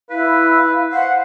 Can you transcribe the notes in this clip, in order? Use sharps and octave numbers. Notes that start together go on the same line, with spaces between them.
E4 B4 F5
C5 F#5